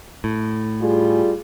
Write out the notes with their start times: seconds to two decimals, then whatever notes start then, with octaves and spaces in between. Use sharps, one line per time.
0.24 A2
0.82 G3 F4 G#4